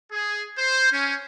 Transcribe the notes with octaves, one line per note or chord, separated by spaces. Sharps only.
G#4
C5
C#4